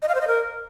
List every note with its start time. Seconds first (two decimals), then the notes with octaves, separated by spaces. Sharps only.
0.02 D#5
0.08 F5
0.15 C5
0.21 D#5
0.27 A#4